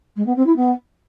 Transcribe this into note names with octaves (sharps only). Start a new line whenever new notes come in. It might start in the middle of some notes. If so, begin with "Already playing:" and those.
G#3
B3
C4
E4
B3